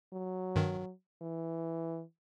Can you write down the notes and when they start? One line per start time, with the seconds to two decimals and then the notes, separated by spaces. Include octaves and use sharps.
0.13 F#3
0.56 G2 D#3
1.22 E3